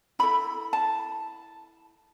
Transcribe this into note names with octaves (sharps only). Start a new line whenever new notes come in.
E4 A4 B5
A5